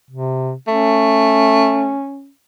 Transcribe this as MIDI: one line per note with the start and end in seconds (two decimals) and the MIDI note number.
0.11 0.54 48
0.68 1.99 57
0.68 2.30 61